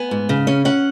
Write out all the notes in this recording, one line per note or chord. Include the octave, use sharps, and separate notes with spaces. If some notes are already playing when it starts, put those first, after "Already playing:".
Already playing: B3 G#5
G#2
C#3
C#4
C#4 F#5